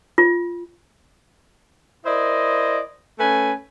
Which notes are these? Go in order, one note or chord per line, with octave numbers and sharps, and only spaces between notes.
F4
E4 A#4 C5 D5 D#5
A3 C#4 B4 G#5